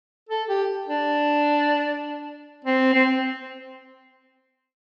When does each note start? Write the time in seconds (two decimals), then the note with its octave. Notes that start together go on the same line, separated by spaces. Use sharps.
0.29 A4
0.49 G4
0.89 D4
2.65 C4
2.94 C4